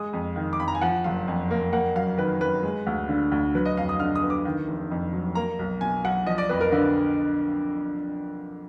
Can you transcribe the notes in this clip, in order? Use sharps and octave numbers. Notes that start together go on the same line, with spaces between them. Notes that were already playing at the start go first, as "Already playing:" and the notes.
Already playing: G#3 D#6
F2
D#3
D6
F2 B5
A#5
G#5
F3 F#5
F#1 F5
F2
A#3
A#3 F#5
F#2 F5
D#3 B4
F#2 B4
G#3
D2
D3
D2
F#3 B4
D#5
F2 F5
D#6
D3 F6
D#6
B3
D6
D#3
F1
F2
F#3
A#3 A#5
B1
B2 G#5
B1 F#5
F3 D#5
D5
F2 B4
A#4
D3 B4